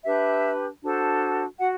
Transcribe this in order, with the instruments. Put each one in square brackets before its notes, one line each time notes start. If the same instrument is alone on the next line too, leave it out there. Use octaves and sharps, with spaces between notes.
[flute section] D4 G4 B4 E5
D4 F#4 A4 C5
F#4 F#5